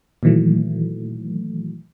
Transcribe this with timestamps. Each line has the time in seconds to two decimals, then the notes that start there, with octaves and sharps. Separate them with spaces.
0.23 A#2 D#3 E3 F#3 A3